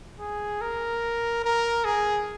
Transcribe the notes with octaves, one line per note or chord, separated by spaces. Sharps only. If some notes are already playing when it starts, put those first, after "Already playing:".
G#4
A#4
A#4
G#4